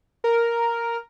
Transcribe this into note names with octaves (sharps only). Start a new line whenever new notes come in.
A#4